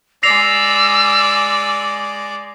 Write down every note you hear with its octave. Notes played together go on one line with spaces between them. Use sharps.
G#3 D5 E6 A#6 C7 F7